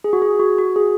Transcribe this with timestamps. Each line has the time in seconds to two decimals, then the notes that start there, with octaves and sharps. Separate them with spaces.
0.04 G#4
0.13 F#4
0.22 G#4
0.40 F#4
0.58 F#4
0.76 G#4